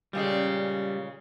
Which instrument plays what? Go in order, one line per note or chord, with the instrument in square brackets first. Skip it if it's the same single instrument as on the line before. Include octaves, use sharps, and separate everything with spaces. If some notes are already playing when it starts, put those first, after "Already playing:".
[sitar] A#2 C#3 G#3 [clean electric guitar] G3